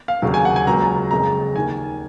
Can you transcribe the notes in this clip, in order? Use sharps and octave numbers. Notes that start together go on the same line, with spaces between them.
F5
F1 D#2 C#3 F#3
G#5
F#5
G#5
C#2 C#3 F#3 A#3 A#5
F#1 F2 C#3 G#3 A#5
D#2 D#3 A#3 G#5